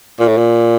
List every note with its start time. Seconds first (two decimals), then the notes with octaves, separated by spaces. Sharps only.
0.20 A#2
0.28 A2
0.38 A#2